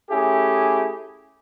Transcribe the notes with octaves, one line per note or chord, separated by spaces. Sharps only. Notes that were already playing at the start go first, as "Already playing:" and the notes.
A3 C#4 E4 G4 G#4